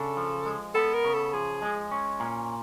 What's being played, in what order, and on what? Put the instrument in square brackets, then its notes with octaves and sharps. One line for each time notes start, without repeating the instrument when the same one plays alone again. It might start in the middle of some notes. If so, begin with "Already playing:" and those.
Already playing: [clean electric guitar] C#3 D4 [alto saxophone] A4
[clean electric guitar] F3
G#3
[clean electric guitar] B3 [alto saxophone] A4
[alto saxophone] A#4
[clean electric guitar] C#3
[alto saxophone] A4
[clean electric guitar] F3 [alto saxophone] G#4
[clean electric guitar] G#3
C#4
A#2